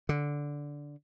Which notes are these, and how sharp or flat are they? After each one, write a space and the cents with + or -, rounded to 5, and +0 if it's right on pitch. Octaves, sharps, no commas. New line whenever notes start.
D3 -10